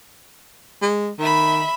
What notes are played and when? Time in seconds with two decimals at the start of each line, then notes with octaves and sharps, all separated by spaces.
0.82 G#3
1.19 D#3 E5 B5